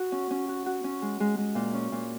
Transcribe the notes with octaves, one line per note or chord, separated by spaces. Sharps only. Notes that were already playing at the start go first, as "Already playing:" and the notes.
Already playing: F#4
C#4
C#4
F#4
F#4
C#4
G#3
G#3
G#3
A#2
C#4
A#2